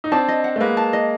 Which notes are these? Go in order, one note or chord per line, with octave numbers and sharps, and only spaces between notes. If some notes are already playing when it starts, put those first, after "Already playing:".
D#4
C4 D4 A5
D#5
F#5
A3
G#3 A#3 B4
A5
D#5